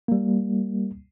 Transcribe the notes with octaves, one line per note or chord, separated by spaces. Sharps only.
G3 A#3